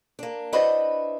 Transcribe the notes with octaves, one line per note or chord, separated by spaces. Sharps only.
A#3 D4
D4 E4 F#4 B4 C5 D#5